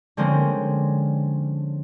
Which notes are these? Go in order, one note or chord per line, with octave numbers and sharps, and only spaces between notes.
D3 F3 G#3 A#3 C4 C#4